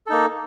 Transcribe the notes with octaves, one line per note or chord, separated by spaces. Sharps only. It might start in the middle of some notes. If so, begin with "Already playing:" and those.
A#3 D#4 A4